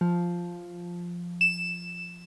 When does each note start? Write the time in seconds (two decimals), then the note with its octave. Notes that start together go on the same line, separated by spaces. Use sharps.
0.01 F3
1.41 E7